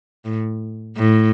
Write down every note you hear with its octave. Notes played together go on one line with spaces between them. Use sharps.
A2
A2